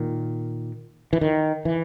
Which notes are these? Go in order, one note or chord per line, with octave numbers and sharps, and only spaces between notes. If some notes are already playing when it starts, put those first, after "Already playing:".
Already playing: A#2 D#3
E3
D#3
E3